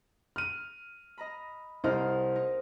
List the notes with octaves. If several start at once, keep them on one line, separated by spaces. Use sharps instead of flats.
F6 D#7
D#5 A#5 B5
C2 G4 A4 C5 D#5 F6
D#4 A#4